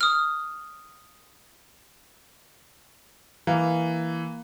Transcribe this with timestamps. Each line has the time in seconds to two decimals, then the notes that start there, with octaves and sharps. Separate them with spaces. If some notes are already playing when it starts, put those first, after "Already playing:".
0.01 D#6 F6
3.47 E3 A#3